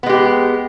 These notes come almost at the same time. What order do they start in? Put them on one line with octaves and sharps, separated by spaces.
B3 G#3 G4